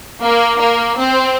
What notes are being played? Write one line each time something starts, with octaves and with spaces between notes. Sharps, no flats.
A#3
A#3
C4